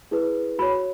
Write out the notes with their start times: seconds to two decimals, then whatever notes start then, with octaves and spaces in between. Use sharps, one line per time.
0.11 E4 G#4 B4
0.59 F#4 B5
0.62 C#5